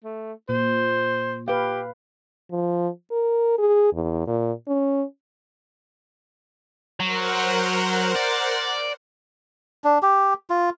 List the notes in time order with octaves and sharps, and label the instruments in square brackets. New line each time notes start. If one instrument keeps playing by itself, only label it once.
[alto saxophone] A3
[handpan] A#2 [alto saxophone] C5
[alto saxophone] G4 [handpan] B4 F5
[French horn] F3
A#4
G#4
E2
A#2
C#4
[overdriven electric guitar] F#3 [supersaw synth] A#4 C5 F#5
[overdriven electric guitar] D5
[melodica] D4
G4
F4